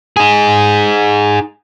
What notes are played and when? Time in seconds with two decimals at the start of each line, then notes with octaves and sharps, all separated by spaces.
0.17 D#4 G#4